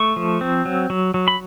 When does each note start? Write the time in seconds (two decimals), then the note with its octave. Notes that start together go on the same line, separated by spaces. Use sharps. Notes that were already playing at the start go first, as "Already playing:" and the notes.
Already playing: A3 C#6
0.16 F3
0.41 C4
0.65 F#3
0.90 F#3
1.14 F#3
1.28 B5